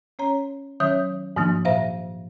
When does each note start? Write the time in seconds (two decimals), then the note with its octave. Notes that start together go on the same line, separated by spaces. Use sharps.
0.19 C#4 C#5 A#5
0.80 D#3 F#3 C#4 C#5 E5 G6
1.36 G#2 D#3 F3 A#3 D4
1.65 A#2 C5 E5 F5